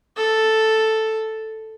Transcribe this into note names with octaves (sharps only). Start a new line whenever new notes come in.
A4